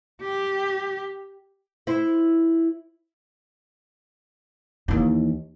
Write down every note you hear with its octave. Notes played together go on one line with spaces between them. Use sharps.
G4
E4 C5
D#2 E3